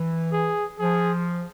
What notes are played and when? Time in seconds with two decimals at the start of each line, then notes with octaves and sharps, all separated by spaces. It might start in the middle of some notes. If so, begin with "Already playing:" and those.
Already playing: E3
0.32 G#4
0.79 F3 G#4